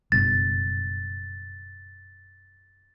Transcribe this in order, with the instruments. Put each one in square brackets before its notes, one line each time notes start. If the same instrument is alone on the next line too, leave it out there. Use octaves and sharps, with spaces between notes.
[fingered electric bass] F#1 G2 B2 [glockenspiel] A6